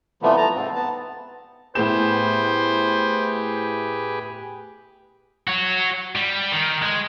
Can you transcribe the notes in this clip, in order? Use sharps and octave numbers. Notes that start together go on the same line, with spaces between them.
C3 E3 F3 G3 A3 B3
A5 A#5
G#2 C4
B3 A5
A2 B3 G4 G#4 B4 C5 E7
F#4 C#5
G3
D#3
G#3